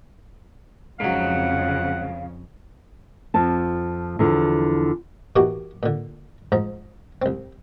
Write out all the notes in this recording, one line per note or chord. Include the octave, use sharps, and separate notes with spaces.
F2 G#2 C#3 F#3 F5 F#5
F2 F3 A5
E2 D3 F3
B2 E3 A#3 F#4 G4
A#2 D3
G#2 F3 A#5
C2 C4